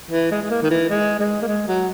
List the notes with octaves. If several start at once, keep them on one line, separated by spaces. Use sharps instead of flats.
E3
G#3
G#3
A#3
D#3
E3
G#3
G#3
A#3
G#3
F#3